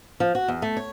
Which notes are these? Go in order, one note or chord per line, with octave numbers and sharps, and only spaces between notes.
F3
F#4
E2
A3
C#5